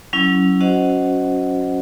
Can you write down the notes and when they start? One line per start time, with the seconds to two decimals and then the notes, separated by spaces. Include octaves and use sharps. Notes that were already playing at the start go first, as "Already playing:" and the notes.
0.13 F#3 C#4 E4
0.61 C#4 F#4 C5 D#5 F#5